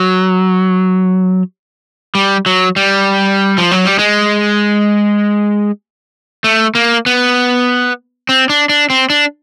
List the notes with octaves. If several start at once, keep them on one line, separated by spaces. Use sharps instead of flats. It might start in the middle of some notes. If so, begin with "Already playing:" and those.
Already playing: F#3
G3
F#3
G3
F3
F#3
G3
G#3
A3
A#3
B3
C4
D4
D4
C4
D4